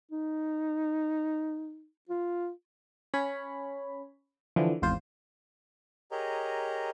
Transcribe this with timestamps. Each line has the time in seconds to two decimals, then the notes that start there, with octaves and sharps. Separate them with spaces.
0.12 D#4
2.09 F4
3.14 C#4 C#5 B5
4.56 D3 E3 F3
4.82 G#1 E2 F4 C5
6.11 G4 G#4 A#4 C#5 D#5 A#5